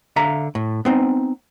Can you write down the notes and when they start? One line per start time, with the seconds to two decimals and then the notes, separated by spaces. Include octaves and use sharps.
0.16 D3 E5 F5 A#5
0.55 A2
0.85 B3 C4 D#4